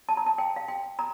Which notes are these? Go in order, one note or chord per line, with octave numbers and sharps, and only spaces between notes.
A5
A#5
A5
G5
F5
G5
A#5